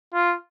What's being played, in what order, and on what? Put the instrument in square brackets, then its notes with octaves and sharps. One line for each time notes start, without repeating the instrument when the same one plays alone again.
[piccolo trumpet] F4